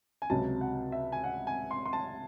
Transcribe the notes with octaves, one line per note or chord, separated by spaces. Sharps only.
G#5
C#2 C3 F#3 A5
F#5
E5
G#5
F#5
G#5
C6
C6
A5